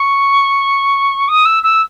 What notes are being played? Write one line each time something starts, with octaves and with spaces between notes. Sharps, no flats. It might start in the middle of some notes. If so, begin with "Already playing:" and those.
Already playing: C#6
D#6
E6
E6